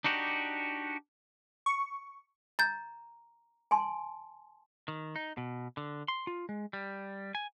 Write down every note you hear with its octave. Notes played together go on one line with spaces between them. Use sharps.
D4 D#4 F#4 G4
C#6
A#5 G6 A6
G#5 A5 C6
D#3
D#4
B2
D3
C6
F4
G#3
G3
G#5